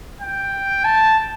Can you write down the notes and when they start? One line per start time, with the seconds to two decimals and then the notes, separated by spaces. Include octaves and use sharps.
0.21 G5
0.84 A5